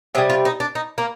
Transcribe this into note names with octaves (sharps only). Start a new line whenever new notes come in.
C3 G3 G#4
F4
D#4
D4
D#4
A#3